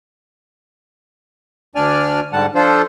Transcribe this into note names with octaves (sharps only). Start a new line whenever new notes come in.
D2 D4 D5 G#5 F6
G#2 D3 G3 F#5 A5
F3 D4 F4 A4 C5